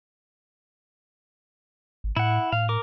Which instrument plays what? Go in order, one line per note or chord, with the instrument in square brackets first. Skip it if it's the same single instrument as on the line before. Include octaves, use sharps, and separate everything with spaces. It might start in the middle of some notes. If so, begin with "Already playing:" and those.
[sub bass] G#1
[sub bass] A2 [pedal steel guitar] E4 F#5
[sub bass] A2 [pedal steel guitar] F5
[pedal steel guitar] A#4 D6